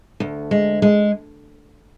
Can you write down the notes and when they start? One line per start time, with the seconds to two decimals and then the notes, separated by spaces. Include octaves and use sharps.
0.20 D2
0.51 G#3
0.82 G#3